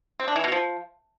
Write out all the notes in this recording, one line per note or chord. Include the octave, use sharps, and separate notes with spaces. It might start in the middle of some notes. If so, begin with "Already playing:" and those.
C4
D4
E3
B2
F3